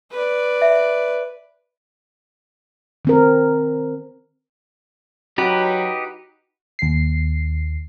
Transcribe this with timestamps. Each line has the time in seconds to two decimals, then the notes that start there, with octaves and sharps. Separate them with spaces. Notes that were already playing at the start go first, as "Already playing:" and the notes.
0.11 B4 D5
0.62 E5
3.05 D#3 C4 A#4
5.38 F#3 D#4 F#4 G4 B4
6.79 D#2 C7